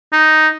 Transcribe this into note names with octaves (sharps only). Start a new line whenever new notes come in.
D#4